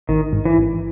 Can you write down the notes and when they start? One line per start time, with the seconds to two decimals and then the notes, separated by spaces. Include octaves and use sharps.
0.09 A1 D#3
0.33 G#2
0.45 E3
0.58 A1